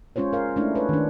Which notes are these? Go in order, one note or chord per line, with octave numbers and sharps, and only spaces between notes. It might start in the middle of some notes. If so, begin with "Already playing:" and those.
G#3 C#4 F4 C5 C#5
A#4 F5
G#3 A3 C#4 D4 E4
B4 C#5
D#3 D4